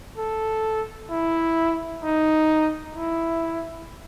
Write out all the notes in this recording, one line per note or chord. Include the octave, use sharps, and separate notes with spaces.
A4
E4
D#4
E4